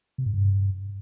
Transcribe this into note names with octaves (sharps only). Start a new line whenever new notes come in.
C3
G#2
G2